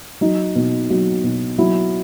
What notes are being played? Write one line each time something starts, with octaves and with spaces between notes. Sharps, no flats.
F#3 D#4
B2
F#3
B2
F#3 E4